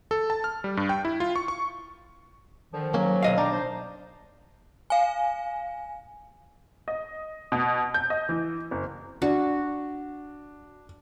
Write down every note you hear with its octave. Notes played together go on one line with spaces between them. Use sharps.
A4
A5
F6
G3
G2
G5
E4
F4
C#6
C#6
D3 D#3 F3
G#2 D#3 F#3 A#3 C#4
B1 D#5 F5
D4 D5 G5 A#5
D#4 C5
F5 G#5
D#5
B2
G6
D#5
E3
F#1
D4 F#4